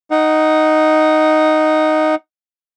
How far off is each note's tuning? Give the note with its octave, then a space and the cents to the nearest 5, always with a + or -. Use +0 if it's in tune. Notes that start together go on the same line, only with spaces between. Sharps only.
D#4 +0 F#5 +15